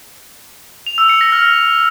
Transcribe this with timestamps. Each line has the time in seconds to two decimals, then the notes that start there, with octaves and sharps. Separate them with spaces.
0.86 F7
0.98 E6
1.09 C#7
1.21 A#6
1.32 F6